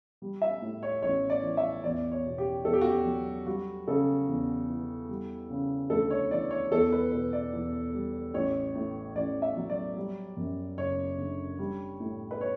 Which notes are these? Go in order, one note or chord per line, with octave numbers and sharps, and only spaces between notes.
G3
E5
A2
C#5
A1 C#5
D5
E3
E5
E2 D5
C#5
B2
G4
E2 A4
G4
F#4
G4
F#3
G3 F#4
C#3 A4
E2
E3
G3
C#3
D2 A4
C#5
E3 D5
C#5
E2 A4
B4
B2 B4
D5
E2
G3
A1 C#5
A2
A1 D5
E5
F#3
D5
G3
F#2
F#1 C#5
D3
G3
A2
B4
C#5